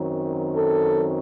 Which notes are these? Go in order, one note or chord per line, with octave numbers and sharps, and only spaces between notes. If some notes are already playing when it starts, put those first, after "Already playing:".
Already playing: F#2 D#3 F#3 C4
A4